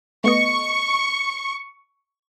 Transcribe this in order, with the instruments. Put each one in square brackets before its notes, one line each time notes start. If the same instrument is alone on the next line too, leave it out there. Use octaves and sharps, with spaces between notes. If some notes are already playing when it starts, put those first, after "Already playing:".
[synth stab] A3 B3 D#5 [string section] C#6